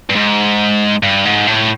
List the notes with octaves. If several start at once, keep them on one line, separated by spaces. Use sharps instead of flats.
G2
G#2
G2
G#2
A2